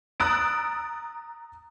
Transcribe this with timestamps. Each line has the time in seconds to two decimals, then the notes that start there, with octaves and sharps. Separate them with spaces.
0.20 A#5 D#6 E6 F#6 A6 D7